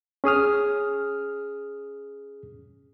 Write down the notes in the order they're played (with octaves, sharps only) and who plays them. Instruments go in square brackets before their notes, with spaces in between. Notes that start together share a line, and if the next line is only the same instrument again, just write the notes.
[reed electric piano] C#4 G#4 D#6 F6